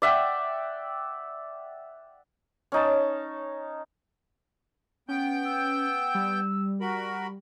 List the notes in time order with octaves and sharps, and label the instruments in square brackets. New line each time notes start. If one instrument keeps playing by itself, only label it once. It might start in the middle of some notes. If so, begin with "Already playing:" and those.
[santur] D5 E5 F#5 G5
C#4 D#4 A5
[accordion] B3 G5 G6 [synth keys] C#4
[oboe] E6
[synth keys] G3
[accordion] F#4 A#4 B5